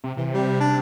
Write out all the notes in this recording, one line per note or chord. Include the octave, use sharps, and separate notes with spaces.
C3
C3 E3
G3
D4